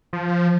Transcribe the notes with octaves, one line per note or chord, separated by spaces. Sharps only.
F3